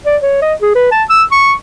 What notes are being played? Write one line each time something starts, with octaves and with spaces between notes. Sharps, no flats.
D5
C#5
D#5
G#4
B4
A5
E6
C#6